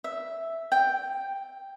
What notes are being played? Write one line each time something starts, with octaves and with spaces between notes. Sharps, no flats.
E5
G5